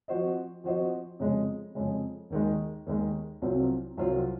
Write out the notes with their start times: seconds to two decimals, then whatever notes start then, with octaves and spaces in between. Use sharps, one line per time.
0.08 F3 C4 F#4 C5 D#5
0.64 F3 C4 F#4 C5 D#5
1.19 F2 C#3 G#3
1.75 F2 C#3 G#3
2.30 D#2 D#3 G#3
2.86 D#2 D#3 G#3
3.42 C2 C3 F#3 C4 F4
3.98 C2 C3 F#3 C4 F4